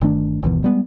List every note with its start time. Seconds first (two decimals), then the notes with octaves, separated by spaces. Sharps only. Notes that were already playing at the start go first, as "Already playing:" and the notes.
0.01 G1 D#3 A3 D4
0.43 G1 D#2 B2 E3
0.64 G3 G#3 B3